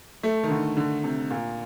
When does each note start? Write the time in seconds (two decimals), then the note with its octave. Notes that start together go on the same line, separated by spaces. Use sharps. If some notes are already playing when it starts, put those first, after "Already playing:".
0.23 A3
0.43 D#3
0.50 D3
0.77 D3
1.04 C3
1.31 A#2